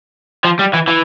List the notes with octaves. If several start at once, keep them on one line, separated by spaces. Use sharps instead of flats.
F3
G3
E3
E3